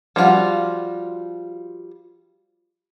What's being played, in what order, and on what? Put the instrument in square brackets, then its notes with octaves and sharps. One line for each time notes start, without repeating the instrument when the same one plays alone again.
[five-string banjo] F3 G3 B3 F4 F#4